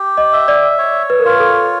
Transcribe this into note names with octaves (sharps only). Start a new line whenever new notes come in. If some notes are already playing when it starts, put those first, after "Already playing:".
Already playing: G4
D#5
E5
D5
C#5
B4
A#4
F4 B4
A4